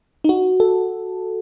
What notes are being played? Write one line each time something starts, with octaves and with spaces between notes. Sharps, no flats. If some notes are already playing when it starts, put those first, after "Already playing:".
D#4
F#4
A4